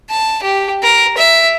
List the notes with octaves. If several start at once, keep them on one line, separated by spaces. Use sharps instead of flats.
A5
G4
A#4
E5